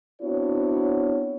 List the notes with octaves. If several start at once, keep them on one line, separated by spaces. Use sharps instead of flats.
B3 C4 D4 E4 F#4 C#5